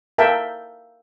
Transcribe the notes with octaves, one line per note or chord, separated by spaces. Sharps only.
A#4 E5 F5 G5 A5